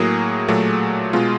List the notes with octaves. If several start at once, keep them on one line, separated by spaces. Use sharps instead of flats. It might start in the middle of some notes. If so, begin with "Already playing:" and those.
Already playing: A2 F#3 A#3 G#4
A#2 F#3 A3
B2 G#3 F4